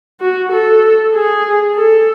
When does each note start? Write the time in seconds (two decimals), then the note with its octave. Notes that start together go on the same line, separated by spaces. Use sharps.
0.20 F#4
0.52 A4
1.13 G#4
1.75 A4